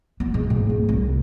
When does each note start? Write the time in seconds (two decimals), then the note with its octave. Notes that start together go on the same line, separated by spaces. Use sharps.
0.20 B3
0.34 G#2
0.50 G#2
0.69 D1
0.89 C2